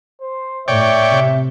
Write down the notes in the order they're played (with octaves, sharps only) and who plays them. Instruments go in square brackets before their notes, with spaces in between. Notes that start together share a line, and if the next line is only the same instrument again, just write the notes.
[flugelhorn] C5
[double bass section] A2 [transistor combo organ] C#5 D5 G5 [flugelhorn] E5
[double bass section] C3